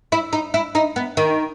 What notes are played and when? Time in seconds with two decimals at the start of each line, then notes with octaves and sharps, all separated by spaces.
0.12 E4
0.33 D#4
0.54 E4
0.75 D#4
0.96 B3
1.17 D#3